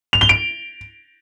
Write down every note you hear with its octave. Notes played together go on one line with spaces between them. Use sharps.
F7
G7
D7